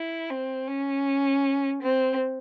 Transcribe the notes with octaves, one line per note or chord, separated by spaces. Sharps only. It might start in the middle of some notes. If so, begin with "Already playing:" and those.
Already playing: E4
C4
C#4
C4